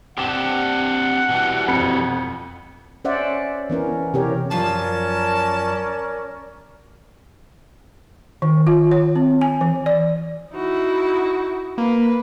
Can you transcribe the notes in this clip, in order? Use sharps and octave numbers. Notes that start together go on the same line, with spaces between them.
C4 D4 G4 F#5 D6 E7
B2 E3 G3
F2 B5 C#7
C#4 C5 D5 E5 F#5
E3 B3 C#4 A#4
C3 E3 C4 G4 A#4 C#5
F#2 F3 C#4 A#4 D5 A5
D#3
F4
C#5
C4
G#5
E3
D5
D#4 E4 F#4
A#3 B4